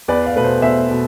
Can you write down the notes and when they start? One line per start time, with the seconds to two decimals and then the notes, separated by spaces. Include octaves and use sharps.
0.08 E2 B4 D5
0.26 D5 F5
0.35 B2 A3 B4
0.44 C5
0.62 E2 C5 E5
0.89 B2 A3